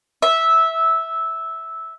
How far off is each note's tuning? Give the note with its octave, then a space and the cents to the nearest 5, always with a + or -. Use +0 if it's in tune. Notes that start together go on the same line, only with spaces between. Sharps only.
E5 -10